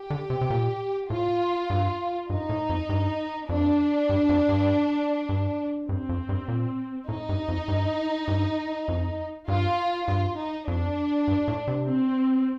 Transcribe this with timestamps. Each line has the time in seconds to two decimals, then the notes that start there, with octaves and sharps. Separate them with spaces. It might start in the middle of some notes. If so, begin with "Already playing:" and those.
Already playing: G4
0.10 D3
0.30 C3
0.41 C3
0.50 A#2
1.10 A2 F4
1.70 G2
2.30 G2 D#4
2.49 A2
2.70 F2
2.89 G2
3.49 F2 D4
4.09 G2
4.29 F2
4.49 G2
5.29 G2
5.89 G2 C4
6.09 F2
6.29 G2
6.48 A#2
7.09 A2 D#4
7.29 G2
7.48 F2
7.68 G2
8.28 G2
8.88 F2
9.48 G2 F4
10.07 G2 F4
10.37 D#4
10.68 F2 D4
11.28 G2
11.48 A2
11.68 C3
11.87 C4